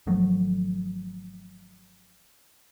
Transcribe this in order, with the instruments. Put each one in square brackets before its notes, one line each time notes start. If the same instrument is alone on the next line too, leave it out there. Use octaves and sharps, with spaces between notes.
[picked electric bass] G#1 F3 F#3 A3